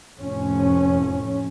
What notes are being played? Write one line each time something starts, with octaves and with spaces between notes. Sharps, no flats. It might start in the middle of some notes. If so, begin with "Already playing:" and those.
F1 F2 A2 C#4